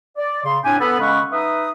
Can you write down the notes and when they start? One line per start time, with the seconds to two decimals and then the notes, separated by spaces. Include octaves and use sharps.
0.17 D5
0.44 C#3 C6
0.64 A2 C4 D4 G4 G#5
0.79 B3 A4 B4
1.00 C#3 G#3 C#4 B4 F#5 C#6
1.32 D#4 B4 E5 D#6